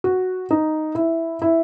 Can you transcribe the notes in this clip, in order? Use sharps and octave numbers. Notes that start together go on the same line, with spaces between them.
F#4
D#4
E4
E4